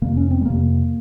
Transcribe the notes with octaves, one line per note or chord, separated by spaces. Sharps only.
F2 C3 A#3
C#4
C4
G#3
F2 C3 A#3